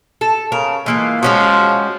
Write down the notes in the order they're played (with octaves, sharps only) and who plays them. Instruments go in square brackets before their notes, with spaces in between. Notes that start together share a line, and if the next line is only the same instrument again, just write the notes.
[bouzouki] A4
[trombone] C#3 [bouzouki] A#4
[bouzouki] E3 A#3 F4 [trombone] G#3
[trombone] F3 [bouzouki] G#3 C#4 F#4